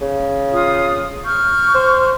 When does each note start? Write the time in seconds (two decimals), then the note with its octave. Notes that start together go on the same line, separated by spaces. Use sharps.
0.01 C#3
0.52 F4 D#6
1.25 C#6 F6 G6
1.74 C5